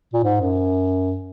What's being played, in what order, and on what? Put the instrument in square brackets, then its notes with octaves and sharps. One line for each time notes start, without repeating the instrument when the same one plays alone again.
[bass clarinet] A#2
G#2
F#2